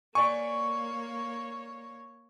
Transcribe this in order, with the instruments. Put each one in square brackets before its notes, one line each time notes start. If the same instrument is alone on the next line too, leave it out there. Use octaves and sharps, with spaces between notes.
[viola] A#3 C#5 [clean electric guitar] D5 G#5 [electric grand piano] C#6